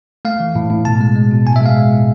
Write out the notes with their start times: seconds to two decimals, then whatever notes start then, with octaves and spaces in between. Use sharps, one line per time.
0.25 A3 F5
0.40 E3
0.55 A2
0.70 A2
0.85 B2 A5
1.01 G#3
1.16 G#3
1.31 B2
1.45 A2 G#5
1.56 E5
1.61 G#3
1.66 F5
1.76 G#3
1.91 A2